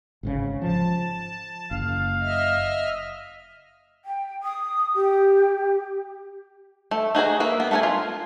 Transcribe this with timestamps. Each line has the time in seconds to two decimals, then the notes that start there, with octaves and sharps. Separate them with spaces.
0.23 G#1 G#2 C#3
0.62 F3 A5
1.71 F#1 F5
2.20 D#5 E5 F6
4.05 G5
4.43 D#6
4.95 G4
6.91 A3
7.15 D#4 F#4 G#4 A#5
7.40 A#3 B4 E5
7.60 B3
7.71 A3 B3 A4 A#4 G#5
7.83 F4